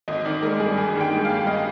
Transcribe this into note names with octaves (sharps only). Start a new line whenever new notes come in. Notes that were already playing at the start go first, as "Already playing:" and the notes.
G#1 D#5
D#3 D5
G#3 A#4
G2 G#4
G#1 G#4
D#3 G5
G#3
F5
G2
D#5